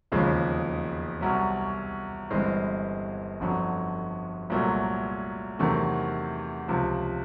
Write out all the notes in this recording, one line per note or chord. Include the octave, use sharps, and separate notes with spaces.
E1 D#2 C#3 F3 G#3
C2 B2 F#3
G1 G2 E3 G#3 C4
G1 F2 D3 F#3
C2 A#2 F#3 A3
E2 C3 D#3 F#3 A3
C#2 C3 F3